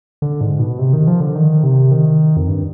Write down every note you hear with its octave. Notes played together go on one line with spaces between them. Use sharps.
D3
G#2
B2
C3
D#3
F3
D3
D#3
C3
D#3
F2
G2